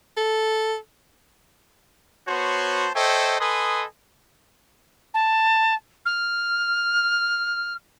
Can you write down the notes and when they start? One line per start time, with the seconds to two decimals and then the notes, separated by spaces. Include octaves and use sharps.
0.17 A4
2.28 B3 F#4 C5 C#5 A5 C6
2.96 A4 C5 C#5 D#5 E5 G5
3.40 A4 B4 D#5 G#5 C6 D#6
5.14 A5
6.05 F6